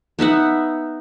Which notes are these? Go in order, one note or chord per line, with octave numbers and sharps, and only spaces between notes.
B3 D#4 E5 F#5